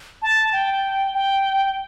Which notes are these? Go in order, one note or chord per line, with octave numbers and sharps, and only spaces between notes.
A5
G5
G5